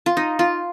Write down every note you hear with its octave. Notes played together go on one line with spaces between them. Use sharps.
F4
D#4
F4